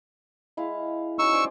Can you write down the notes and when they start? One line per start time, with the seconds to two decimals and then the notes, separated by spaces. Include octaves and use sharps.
0.57 G#3 E4 F5
1.19 F#3 C#4 D#4 C#6 E6
1.33 C#4 C5 D5